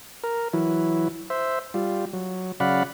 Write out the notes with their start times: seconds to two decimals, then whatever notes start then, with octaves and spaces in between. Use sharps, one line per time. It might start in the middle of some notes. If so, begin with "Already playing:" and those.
0.24 A#4
0.53 E3 F#3 E4
1.30 C5 E5
1.74 G3 F4
2.13 F#3
2.60 C#3 F#3 D5 F5 F#5 B5